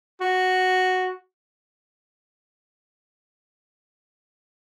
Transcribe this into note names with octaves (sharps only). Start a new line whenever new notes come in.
F#4